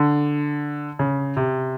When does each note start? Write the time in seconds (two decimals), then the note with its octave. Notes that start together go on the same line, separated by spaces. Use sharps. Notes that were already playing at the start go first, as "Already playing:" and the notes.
Already playing: D3
0.99 C#3
1.37 C3